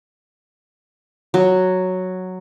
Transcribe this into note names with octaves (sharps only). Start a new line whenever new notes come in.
F#3